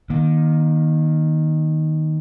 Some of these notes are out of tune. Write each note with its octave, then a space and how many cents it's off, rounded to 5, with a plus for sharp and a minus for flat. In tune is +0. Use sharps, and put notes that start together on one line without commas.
D#3 +0 A#3 +35